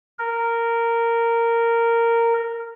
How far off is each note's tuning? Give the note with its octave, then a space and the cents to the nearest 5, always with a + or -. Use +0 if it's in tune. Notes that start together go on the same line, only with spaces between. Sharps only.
A#4 -10